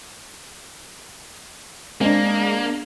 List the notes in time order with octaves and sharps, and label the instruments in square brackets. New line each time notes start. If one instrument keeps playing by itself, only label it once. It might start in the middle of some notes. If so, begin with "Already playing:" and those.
[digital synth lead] G#3 [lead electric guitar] A#3 [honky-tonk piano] C4 D4